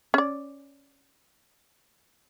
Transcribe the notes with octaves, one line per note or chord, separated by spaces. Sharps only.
C#4 D5